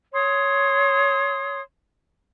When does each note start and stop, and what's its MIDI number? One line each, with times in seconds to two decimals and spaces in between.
0.14 1.61 73
0.14 1.61 84
0.14 1.61 87